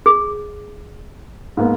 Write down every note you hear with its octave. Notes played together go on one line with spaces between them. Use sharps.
G#4
G#2 A#3 B3